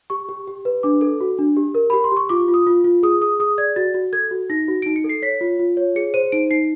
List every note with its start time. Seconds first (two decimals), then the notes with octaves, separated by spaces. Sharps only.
0.10 G4 C#6
0.29 G4
0.48 G4
0.65 B4
0.83 D4 D6
1.01 A4
1.20 F#4
1.39 D4
1.57 G4
1.75 A#4
1.90 G4 B5
2.04 C6
2.12 G4 C#6
2.29 F4 D6
2.48 F4
2.54 D#6
2.67 F4
2.84 F4
3.03 G#4 D#6
3.21 G#4 D#6
3.39 G#4 D#6
3.58 D5 G#6
3.76 F#4 A6
3.94 F#4
4.13 A4 G#6
4.31 F#4
4.50 D#4 A#6
4.68 F#4
4.82 D#4 D7
4.96 C#7
5.04 A4
5.09 C7
5.22 C#5 B6
5.41 F4
5.59 F4
5.77 C#5
5.96 G#4 C#7
6.14 C5 D#7
6.32 D#4 D7
6.51 D#4 C7